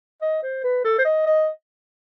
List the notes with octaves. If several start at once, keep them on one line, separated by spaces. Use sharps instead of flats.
D#5
C5
B4
A4
C5
D#5
D#5